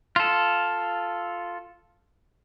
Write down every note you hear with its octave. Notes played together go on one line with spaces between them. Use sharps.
F4 A4